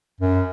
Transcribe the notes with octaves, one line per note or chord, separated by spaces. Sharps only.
F#2